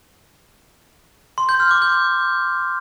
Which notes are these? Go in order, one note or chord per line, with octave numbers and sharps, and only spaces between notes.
C6
G6
F6
D6
G6